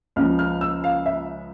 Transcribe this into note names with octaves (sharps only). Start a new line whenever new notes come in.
C#2 C#3 F3 F6
F6
E6
F5
E5